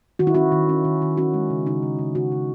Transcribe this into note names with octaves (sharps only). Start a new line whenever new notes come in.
D#3 F#4
E4
C#4 F#4
D#3
C#4
D#3
D#3
C#4 F#4
G#3
C#3
C#3 D#4
C#3
C#3
C#3 F#4
C#3